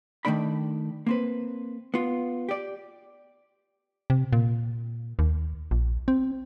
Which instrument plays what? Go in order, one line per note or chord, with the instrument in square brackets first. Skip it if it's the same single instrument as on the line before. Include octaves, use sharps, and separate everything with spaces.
[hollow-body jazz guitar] D#3 E3 A3 D4 D5 B5
A#3 C4 B4
B3 F4
G4 D5
[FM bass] C3
A#2
D#2
A#1
C4